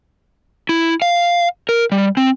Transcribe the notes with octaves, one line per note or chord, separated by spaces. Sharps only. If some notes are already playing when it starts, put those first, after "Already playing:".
E4
F5
A#4
G3
C4